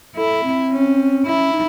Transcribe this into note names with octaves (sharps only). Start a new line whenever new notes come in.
E4 A4
C4
C#4
C#4 E4
D#4